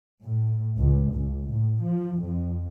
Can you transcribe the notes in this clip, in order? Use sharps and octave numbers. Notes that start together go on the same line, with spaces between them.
A2
C#2
C#2
A2
F3
F2